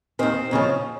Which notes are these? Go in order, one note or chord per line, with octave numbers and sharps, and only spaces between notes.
D#2 D#3 C4
D#2 C#3 F3